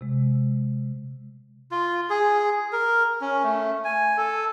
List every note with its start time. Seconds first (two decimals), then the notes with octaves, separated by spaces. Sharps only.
0.01 C3 G#3
1.71 F4
2.10 G#4
2.73 A#4
3.21 C#4
3.44 A3
3.84 G#5
4.17 A4